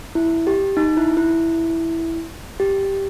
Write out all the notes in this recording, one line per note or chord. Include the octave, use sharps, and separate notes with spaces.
E4
G4
D#4
E4
E4
G4